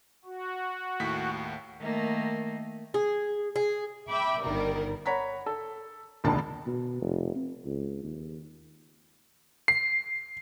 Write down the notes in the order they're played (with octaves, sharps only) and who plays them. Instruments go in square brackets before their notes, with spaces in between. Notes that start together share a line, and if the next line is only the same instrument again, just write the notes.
[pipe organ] F#4
[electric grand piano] D#2 A2 B6
[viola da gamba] D#3 A3 A#3
[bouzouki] G#4
G#4
[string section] E5 G5 B5 D6
G1 D#3 G3 A#4
[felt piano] C#5 F#5 A#5 B5 B6
A4
E1 C#2 A#2 D3 D#3 A5
[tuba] B2
F1
C4
C#2
D#2
[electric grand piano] C7